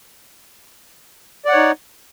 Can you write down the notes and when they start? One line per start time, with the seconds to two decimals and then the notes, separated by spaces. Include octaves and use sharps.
1.45 D5
1.49 F#5
1.52 C#5
1.56 D#4